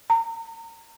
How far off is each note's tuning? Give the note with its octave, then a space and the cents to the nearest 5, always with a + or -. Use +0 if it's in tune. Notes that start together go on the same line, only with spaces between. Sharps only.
A#5 -30